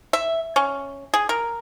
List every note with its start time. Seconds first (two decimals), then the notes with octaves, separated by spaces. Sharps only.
0.13 E5
0.56 C#4
1.14 G#4
1.29 A#4